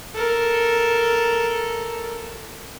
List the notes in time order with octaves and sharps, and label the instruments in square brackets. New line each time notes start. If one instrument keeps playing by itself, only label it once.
[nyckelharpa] A4 A#4